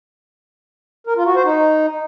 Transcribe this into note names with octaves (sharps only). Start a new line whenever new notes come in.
A#4
F4
F#4
C5
D#4